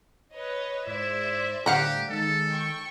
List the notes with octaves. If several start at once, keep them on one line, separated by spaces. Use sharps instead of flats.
B4 C#5 D#5
G#2 E4 C5 D5 E5
A2 D3 G3 G4 F5 F#5 A#5
D#3 G#3 D#4 A4
G5 C#6